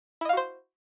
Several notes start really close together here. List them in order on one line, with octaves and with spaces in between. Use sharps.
E4 D#5 F5 F#4 C5